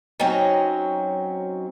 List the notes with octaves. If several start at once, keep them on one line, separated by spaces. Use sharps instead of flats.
F#3 C4 C#4 D#4